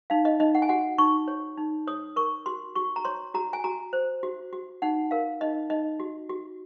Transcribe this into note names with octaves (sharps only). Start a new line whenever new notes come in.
D#4 F5
D#5
D#4 D#5
F#5
G#5
F#4 F#5
D#4 C#6
C#5
D#4
C#5 D#6
A#4 C#6
F#4 C6
F#4 C#6
A#5
C#5 C6
F#4 A#5
G#5
F#4 A#5
C5
F#4
F#4
D#4 F#5
A#4 F5
D#4 D#5
D#4 D#5
F#4
F#4